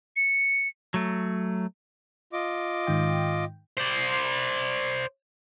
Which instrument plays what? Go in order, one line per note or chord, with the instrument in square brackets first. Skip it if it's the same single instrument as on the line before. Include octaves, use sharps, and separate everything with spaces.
[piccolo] C#7
[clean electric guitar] F#3 A3
[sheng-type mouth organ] F4 D#5 D6
[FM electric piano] G#2 D#3 G5
[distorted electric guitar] C5 D5